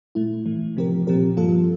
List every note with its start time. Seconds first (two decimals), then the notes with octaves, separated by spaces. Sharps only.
0.15 A#2 A3 E4
0.46 A2 E3 A3
0.77 C3 F3 C4 G4 A#4
1.07 A#2 F3 C4 G4 A#4
1.37 G2 F3 A#3 F4 A4